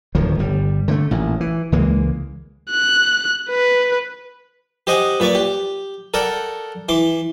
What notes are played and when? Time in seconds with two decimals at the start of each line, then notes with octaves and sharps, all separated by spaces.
0.15 D1 D2 D#3 F3
0.39 G1 G3
0.88 D3 F3 A3
1.11 A1 A#2
1.40 E3
1.72 C#2 E3 G#3 A#3
2.71 F#6
3.50 B4
4.87 G4 C5 D#5 F#5 G#5
5.20 A#2 B4 D5 C#6 D6
5.35 G4
6.14 A4 A#4 D5 F#5 G5
6.89 E3 C6 D6